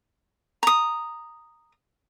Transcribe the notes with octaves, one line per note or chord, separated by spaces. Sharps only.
A#5 D#6